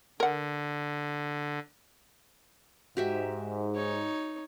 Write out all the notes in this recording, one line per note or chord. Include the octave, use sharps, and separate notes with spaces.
D3 A#4 F#5
G#2 F#4 G4 E5
D#4 C#5